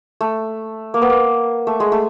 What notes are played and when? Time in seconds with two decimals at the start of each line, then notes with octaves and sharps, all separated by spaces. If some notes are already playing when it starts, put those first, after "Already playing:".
0.21 A3
0.94 A#3
1.02 B3
1.10 A#3
1.67 A3
1.80 G#3
1.92 A3